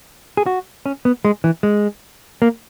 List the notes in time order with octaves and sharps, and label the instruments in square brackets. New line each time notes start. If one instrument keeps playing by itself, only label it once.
[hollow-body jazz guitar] G#4
F#4
C#4
B3
G#3
E3
G#3
A#3